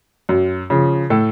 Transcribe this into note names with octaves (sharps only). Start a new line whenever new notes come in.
F#2
C#3 F3
A2 A4